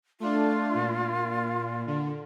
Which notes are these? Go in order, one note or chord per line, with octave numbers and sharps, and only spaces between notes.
A3 D4 F4
A#2
D3